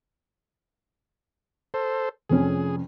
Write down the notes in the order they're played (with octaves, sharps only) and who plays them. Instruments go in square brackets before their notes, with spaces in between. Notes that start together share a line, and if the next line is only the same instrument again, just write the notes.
[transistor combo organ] A4 C5
[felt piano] F1 F2 C#4 [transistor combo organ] G#4